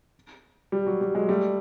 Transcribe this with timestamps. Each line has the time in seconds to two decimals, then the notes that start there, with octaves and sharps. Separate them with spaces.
0.72 G3
0.87 F#3
1.01 G3
1.15 F#3 G#3
1.29 G3 A3